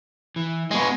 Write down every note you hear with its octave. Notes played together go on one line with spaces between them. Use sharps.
E3
B2 G#3 D#5